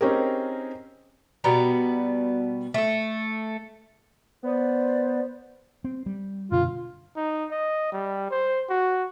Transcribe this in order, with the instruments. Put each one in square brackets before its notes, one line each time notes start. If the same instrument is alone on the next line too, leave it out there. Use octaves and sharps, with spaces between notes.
[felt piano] C4 C#4 D#4 G4 G#4 A#4
[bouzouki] B2 G3 B3 A#5
A3 A4
[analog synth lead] B3 [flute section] C5 D5
[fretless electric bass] C4
G3
[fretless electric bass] F#2 B2 D3 [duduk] F4
[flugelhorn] D#4
D#5
G3
C5
F#4